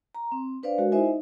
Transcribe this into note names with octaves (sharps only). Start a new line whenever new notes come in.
A#5
C4
D4 B4 C5 D5 F5
G#3 F#4 A#4
D#4 E4 C5 D#5 E5 G#5
D#4